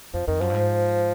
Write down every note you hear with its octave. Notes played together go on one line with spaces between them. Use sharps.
F2 F3
F2 D#3
F#2 F3
G2
G#2